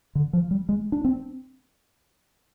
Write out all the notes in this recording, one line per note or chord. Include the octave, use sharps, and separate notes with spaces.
D3
F3
G3
G#3
D4
C4